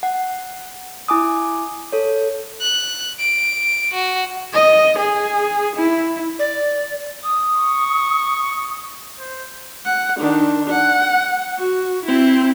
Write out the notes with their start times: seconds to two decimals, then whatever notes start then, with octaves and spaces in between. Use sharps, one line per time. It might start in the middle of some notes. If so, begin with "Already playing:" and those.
0.03 F#5
1.08 E4 G#5 D6 D#6
1.92 A4 C#5
2.61 F#6
3.19 D7
3.94 F#4
4.53 D#5
4.98 G#4
5.76 E4
6.39 D5
7.23 D#6
7.55 C#6
9.20 C5
9.85 F#5
10.18 D#3 D4
10.70 F#5
11.58 F#4
12.06 C4 E4